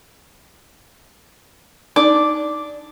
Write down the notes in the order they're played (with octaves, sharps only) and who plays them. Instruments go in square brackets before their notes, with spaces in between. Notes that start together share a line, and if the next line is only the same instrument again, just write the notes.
[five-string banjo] D4 [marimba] D#4 D5 [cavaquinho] D6